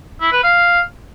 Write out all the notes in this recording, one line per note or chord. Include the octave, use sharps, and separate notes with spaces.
E4
B4
F5